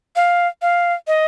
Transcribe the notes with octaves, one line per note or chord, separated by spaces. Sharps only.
F5
F5
D#5